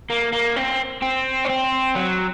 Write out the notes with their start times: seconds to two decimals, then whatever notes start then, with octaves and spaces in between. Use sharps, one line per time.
0.10 A#3
0.33 A#3
0.56 C4
1.02 C4
1.45 C#4
1.49 C4
1.95 F#3